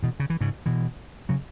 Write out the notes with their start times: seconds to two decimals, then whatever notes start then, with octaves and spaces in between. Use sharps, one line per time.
0.03 B2 E3
0.20 C#3
0.30 E3
0.41 G#2 C#3
0.66 B2 E3
1.29 C#3 F#3